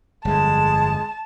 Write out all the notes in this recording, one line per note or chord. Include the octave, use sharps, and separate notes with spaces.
G1 F2 G#3 A5